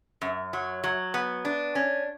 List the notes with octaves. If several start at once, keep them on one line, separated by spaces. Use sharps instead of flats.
F#2
F#3
F#3
B3
D4
C#4